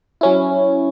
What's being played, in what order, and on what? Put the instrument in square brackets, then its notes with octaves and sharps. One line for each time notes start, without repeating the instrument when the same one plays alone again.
[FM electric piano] F#3 C#4 E4